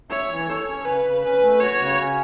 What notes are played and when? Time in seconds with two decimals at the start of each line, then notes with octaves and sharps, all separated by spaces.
0.10 C#5 E5
0.29 E3
0.48 A4 C#5
0.68 C#4
0.85 C#3 B4
1.05 C#3
1.23 C#4 B4
1.42 A3
1.60 F#4 C#5
1.79 C#3
1.99 C#4